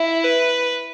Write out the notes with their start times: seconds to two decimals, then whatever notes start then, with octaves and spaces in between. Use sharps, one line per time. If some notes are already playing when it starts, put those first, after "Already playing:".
Already playing: E4
0.25 B4